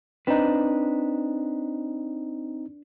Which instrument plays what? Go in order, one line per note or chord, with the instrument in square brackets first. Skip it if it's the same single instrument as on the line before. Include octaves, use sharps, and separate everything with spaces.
[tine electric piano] C4 D#4 [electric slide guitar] D4 B4